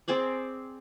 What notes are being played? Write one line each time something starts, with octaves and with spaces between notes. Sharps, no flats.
C4 G#4 C5 D5